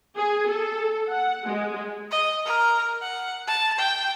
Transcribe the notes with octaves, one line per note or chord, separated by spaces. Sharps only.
G#4
A4
F#5
G#3
D#5
A#4
F#5
A5
G5